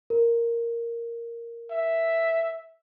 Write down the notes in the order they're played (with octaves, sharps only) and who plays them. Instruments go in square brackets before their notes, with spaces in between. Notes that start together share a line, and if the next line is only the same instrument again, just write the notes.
[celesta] A#4
[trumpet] E5